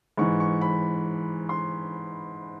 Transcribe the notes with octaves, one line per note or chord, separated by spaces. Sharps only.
G#2 E3 C#6
C#6
B5
C6